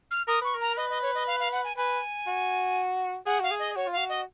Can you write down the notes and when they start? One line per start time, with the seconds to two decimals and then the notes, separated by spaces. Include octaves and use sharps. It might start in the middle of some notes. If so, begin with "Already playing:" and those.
0.11 F6
0.28 A#4 D#6
0.41 B4 C#6
0.55 A#4
0.61 A#5
0.77 B4 D#5
0.90 D#5
1.02 C#5
1.15 D#5
1.27 F5
1.40 F5
1.52 F#5
1.64 G#5
1.77 B4 G#5
2.27 F#4
3.26 G#4 F#5
3.40 F#4 F5
3.51 G#4
3.59 D#5
3.76 F#4 C#5
3.86 F4
3.92 F#4 F5
4.09 D#5